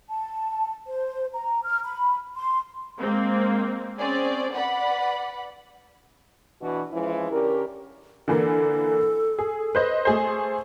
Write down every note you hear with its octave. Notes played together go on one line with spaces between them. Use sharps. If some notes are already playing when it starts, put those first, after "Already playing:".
A5
C5
A#5
F6
B5
C6
G#3 A#3 C4
C4 C#4 G#4 D5
B4 D5 F#5 B5
B2 E3 D4 F#4
E3 F3 G#3 C#4 E4
D3 C#4 G4 A#4
D3 E3 A#3 A4
G#4
B4 C5 D#5
A3 G#4 C5